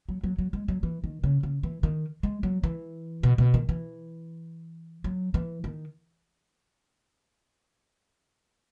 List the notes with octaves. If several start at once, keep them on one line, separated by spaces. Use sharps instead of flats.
F#3
F#3
F#3
G#3
F#3
E3
D#3
C#3
C#3
E3
D#3
G#3
F#3
E3
B2
B2
D#3
E3
F#3
E3
D#3